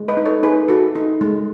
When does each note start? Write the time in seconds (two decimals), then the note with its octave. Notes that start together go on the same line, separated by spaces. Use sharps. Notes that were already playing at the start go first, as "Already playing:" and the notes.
Already playing: G#3
0.08 B4 D#5
0.17 D#4
0.26 A4 C#5
0.43 D#4 G#4 B4
0.68 F#4 A4
0.95 D#4 A4
1.21 G#3